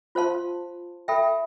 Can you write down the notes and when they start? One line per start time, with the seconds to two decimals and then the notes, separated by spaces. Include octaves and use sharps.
0.15 F4 C5 F5 A5 C6
1.08 A4 E5 G5 B5